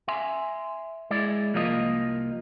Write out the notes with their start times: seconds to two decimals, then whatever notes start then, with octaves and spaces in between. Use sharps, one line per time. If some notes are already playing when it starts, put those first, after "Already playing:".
0.08 E5 G#5 C6
1.11 G#3 E4 D5
1.54 C2 F3 A#3 F4 D#5